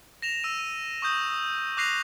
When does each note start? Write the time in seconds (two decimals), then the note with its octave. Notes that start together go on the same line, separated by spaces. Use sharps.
0.22 A#6 E7 F7
0.44 E6 D#7
0.59 D#7
1.02 C#6 D#6 G6
1.31 D#6
1.77 D6 F#6 A#6 C7 D#7 F7